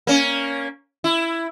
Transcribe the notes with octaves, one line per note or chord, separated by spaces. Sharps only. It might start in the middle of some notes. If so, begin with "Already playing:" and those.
A#3 C#4
E4